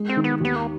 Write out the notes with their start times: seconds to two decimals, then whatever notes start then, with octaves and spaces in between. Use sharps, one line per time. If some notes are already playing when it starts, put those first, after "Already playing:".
Already playing: G#3
0.09 C4
0.17 D#3
0.24 B3
0.40 D#2 B3
0.56 A#3